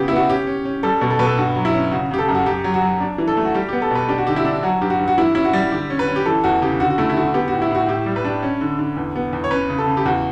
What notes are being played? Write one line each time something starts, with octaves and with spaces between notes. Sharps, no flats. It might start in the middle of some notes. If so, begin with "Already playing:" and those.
Already playing: C#3 B3 F#4 G4
E4
B3 F#4
C#4 G4
C#4
C#4
G3 A4
B2
A4
B2 B4
A4
G2 F#4
F#3
E4
C#4
C#3 F#4
C#3 G4
A4
F#2
F#4
F#2 G4
F#3
F#4
F#3
D4
E3
A4
A3
F#4
G3 G4
B3 G4
A4
B2 B4
D4 G4
F#4
D3 G4
E4
D4
F#3 F#4
G2 G4
F#4
G2
F#4
E3 E4
C#4 E4
F#4
G3
D3 G4
C#4
B4
C#4
G4
E3 A4
E2 F#4
C#3 G4
D3 F#4
F#4
A3 E4
E4
D3 F#4
B3 G4
A2 F#4
E4
A2 F#4
A2 G4
G3
B4
D4
C#4
D3
D3
E2
B3
E2
C#5
C#4 B4
C#3
A4
C#3
G4
E2 F#4